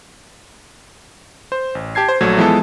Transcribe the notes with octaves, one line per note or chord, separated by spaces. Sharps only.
C5
A1
G4 A5 G#6 C7
C5
A#1 F#3 A3 G#6
E3 F3 G#3 B3 E4 A4